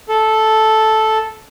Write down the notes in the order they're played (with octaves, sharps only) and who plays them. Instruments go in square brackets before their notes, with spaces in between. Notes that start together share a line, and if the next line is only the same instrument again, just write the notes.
[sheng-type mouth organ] A4